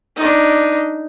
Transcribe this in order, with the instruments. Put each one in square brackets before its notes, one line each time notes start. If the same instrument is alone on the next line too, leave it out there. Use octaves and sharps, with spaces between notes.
[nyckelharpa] D4 D#4